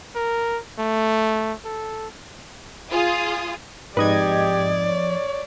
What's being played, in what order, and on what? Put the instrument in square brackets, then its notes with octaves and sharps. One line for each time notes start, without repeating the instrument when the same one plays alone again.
[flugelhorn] A#4
A3
A4
[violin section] F4 G#4 D#6
[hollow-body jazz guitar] F2 D#4 B4 [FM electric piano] G#2 D#5 G#6 [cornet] G4 [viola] D5
[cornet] C#5